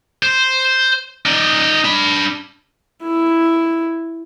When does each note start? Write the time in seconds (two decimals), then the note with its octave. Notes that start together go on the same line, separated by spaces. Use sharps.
0.23 C5
1.26 D#4 D5
1.84 D4 B5
3.02 E4